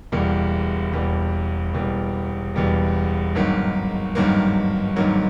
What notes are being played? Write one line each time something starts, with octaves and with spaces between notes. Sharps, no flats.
E1 E2 B2 G3 A#3
E1 E2 B2 G3 A#3
E1 E2 B2 G3 A#3
E1 E2 B2 G3 A#3
G#1 G2 D#3 F#3 A#3
G#1 G2 D#3 F#3 A#3
G#1 G2 D#3 F#3 A#3